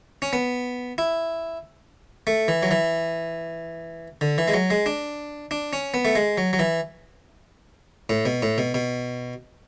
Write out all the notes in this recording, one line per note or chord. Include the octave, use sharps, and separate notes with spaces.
C#4
B3
E4
A3
E3
F#3
E3
D3
E3
G#3
F#3
G#3
D4
D4
C#4
B3
A3
G#3
F#3
F#3
E3
A2
B2
A2
B2
B2